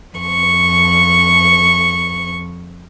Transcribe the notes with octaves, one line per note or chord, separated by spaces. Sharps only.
F2 C#6